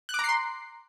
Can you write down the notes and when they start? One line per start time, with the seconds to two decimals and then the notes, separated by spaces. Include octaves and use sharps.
0.09 F#6
0.14 D6
0.19 A#5
0.24 C7
0.29 C6